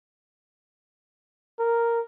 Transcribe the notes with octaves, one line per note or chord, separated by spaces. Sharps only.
A#4